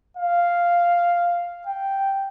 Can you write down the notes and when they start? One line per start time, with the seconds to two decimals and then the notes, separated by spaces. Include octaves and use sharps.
0.17 F5
1.67 G5